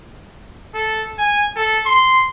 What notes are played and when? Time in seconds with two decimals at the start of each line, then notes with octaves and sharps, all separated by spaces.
0.74 A4
1.19 G#5
1.56 A4
1.86 C6